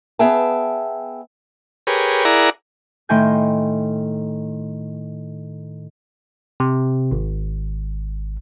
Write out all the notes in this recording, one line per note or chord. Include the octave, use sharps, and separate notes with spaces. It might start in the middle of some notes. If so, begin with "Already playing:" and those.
B3 G#4 E5 G5 A5
G4 G#4 A#4 B4 C#5
E4 G#4 A#4 D5 F#5 A#5
A2 D#3 G5 G#5 C6 G6
C3
G#1